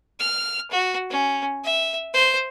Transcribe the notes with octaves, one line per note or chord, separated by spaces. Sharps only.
F6
F#4
C#4
E5
C5